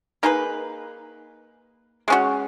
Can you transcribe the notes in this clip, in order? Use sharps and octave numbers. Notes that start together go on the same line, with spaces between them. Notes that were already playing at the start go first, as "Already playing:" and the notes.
A#3 D#4 G#4 B4
G#3 C#4 F#4